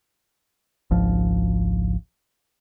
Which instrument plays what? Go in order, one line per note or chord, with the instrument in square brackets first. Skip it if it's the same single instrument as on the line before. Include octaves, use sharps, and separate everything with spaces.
[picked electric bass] G#1 C#2 F3